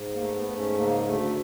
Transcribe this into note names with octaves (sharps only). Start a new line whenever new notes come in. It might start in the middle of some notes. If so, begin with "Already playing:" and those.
Already playing: G#2
A#3
A3
B3
G#2
C#4
C#3 A#3
D2 A3